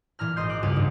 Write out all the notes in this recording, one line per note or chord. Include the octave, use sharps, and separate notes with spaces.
A#2 E3 A#5 F6
G#1 D#5 C6 G6
D6 F#6
F1 C#2 G2 F4 F5 F#5
G#2 D#3 D4